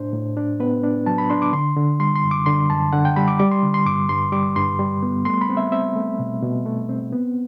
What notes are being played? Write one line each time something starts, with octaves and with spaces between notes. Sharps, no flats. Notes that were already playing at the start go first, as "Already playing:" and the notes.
Already playing: A2 D4 C5
A2
D4
B3 B4
D4
F#3 A5
B5
D4 C6
D6
D3 C6
D3
G3 C6
C6
F#2
D6
D3 C6
F#2 A5
D3 F#5
G5
G3 B5
D6
G3 D6
C6
D3
C6
G2 D6
G2 C6
G3 D6
G2 C6
G3
B3
A3 C6
B5
C4
E5
C4 E5
A3
B2
B2
A3
C4
B3